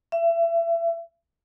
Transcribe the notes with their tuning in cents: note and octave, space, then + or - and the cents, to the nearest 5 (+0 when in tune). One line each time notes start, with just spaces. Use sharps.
E5 +30